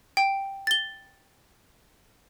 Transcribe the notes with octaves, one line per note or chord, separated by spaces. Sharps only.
G5
A6 G7